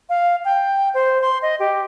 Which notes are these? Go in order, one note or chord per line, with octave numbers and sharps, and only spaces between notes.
F5
G5
C5
C6
D#5
G4